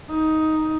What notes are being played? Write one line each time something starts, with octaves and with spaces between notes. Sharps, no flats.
D#4